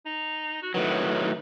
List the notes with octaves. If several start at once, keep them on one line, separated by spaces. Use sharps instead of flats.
D#4
F#4
A2 D#3 F#3 B4